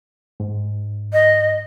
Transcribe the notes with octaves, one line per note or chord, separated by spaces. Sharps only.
G#2
D#5